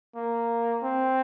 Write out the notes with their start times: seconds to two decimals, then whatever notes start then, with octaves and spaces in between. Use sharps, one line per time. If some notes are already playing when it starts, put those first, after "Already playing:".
0.15 A#3
0.83 C4